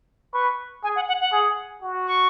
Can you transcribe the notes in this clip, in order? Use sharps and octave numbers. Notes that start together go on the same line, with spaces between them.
B4 C#6
G#4 G#5
F#5
F#5
F#5
G#4
F#4
C#6